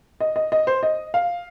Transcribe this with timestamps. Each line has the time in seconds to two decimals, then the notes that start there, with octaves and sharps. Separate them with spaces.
0.20 D#5
0.36 D#5
0.52 D#5
0.67 C5
0.83 D#5
1.14 F5